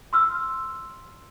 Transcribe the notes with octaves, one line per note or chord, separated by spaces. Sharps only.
C6 E6 F6